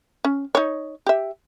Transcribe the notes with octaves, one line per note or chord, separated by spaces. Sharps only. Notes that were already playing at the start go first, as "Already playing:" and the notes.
C#4
D#4 C#5
G4 E5